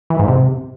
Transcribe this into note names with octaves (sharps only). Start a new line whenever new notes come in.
E3
G#2
C3